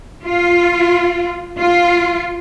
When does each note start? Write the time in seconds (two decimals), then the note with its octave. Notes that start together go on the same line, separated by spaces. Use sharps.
0.25 F4
1.60 F4